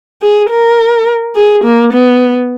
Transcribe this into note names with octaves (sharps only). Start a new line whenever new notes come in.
G#4
A#4
G#4
A#3
B3